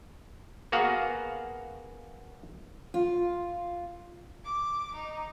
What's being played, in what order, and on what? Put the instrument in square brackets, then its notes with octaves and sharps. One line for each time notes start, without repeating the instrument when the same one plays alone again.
[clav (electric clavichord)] A#3 B3 F#4 G#4 F5 F#5
[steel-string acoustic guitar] F4
[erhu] D6
D#4